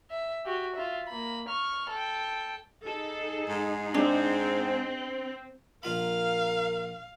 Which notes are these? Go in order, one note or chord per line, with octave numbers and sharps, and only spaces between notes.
E5
F#4 G4
F4 E5
A#3 B5
C#6 F6
A4 G5
D#4 G#4 A4
G#2
C4 D4
A#1 F4 A#4 F5 B5